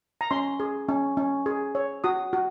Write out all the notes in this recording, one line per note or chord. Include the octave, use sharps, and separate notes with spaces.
A#5
C#4 C6
G#4
C#4
C#4
G#4
C#5
F#4 D#6
F#4